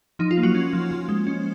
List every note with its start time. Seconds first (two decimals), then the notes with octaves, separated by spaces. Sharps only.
0.19 F3 D#4
0.31 F4
0.37 A#3
0.43 F#3 F#4
0.55 C#4
0.73 F3
0.91 F3
1.09 G#3
1.27 C#4